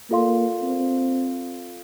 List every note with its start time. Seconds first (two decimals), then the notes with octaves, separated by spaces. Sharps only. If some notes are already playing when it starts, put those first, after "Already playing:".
0.10 A#3 F4 A4 D5 F5 C6
0.63 C4